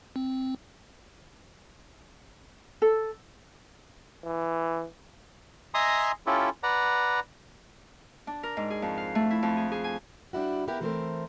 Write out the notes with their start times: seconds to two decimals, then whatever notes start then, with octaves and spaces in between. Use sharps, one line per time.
0.16 C4
2.82 A4
4.25 E3
5.74 D#5 E5 G#5 A#5 C6 D#6
6.26 C#4 E4 F4 G4 A4
6.63 B4 D5 F#5 A#5
8.27 D4
8.43 A#4
8.57 G#2
8.70 G#4
8.82 F2
8.97 F5
9.15 A3
9.31 E4
9.43 F2
9.57 G#4
9.72 G#4
9.84 G#5
10.33 G3 D4 E4 F#4
10.68 B3 E4 G4 A#4
10.81 E3 A3 C4 A4 A#4 C5